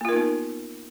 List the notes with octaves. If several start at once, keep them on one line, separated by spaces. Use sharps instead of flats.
A#3 B3 D#4 F4 A#4